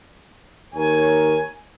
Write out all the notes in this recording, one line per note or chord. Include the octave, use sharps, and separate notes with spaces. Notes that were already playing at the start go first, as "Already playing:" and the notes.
D#2 A#4 C#5 G#5